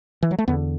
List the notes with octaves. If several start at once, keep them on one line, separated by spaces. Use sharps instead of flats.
E3
F#3
A3
E2 D3 B3